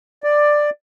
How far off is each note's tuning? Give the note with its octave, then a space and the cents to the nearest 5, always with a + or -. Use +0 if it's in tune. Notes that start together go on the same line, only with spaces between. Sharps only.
D5 +10